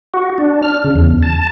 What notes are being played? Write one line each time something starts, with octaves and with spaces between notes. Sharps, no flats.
F#4
D4
F6
C#3
E2
A5